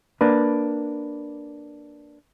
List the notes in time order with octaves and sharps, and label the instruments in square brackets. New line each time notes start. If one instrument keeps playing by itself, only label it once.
[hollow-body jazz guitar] A#3 D4 B4